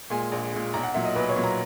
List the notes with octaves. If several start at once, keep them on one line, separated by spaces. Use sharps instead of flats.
A#2 G#3 G#5
G#5
A#1
A#2 G#3
B1 A#5
F#5
A#2 F#3 E5
D#5
B1 B4
C#5
A#2 F#3
A#5